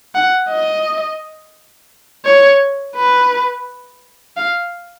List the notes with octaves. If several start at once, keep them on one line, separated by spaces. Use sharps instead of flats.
F#5
D#5
C#5
B4
F5